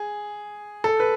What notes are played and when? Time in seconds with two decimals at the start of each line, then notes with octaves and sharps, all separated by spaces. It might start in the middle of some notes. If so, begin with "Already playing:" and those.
Already playing: G#4
0.84 A4
1.00 B4